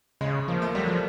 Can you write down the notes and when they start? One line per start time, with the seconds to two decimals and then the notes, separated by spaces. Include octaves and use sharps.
0.21 C#3 G#3
0.48 F3 A#3
0.62 A3
0.75 F#3 G3
0.88 F3